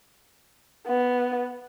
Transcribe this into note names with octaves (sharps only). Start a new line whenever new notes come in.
B3